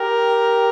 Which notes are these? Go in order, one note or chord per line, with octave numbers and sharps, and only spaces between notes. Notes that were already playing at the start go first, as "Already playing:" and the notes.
Already playing: G4 A#4